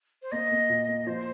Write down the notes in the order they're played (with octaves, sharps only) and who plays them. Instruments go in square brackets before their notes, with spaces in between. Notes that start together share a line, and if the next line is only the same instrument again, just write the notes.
[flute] C5
[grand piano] A#3 [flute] D#5
[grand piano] A#3
A#2
A#3
[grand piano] F3 [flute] C5